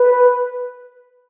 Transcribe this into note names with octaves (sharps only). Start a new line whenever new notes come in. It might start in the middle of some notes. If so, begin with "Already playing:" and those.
Already playing: B4